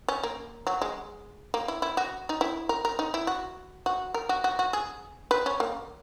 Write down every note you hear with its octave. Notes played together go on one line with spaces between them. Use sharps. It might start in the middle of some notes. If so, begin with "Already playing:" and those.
C#4
A#3
F#3
G#3
A#3
E4
E4
F#4
D#4
E4
A#4
A#4
D#4
E4
F#4
F#4
A#4
F#4
F#4
F#4
G#4
B4
C#4
A#3